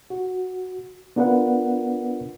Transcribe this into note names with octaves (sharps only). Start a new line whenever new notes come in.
F#4
B3 D4 F4 A#4 B4 F#5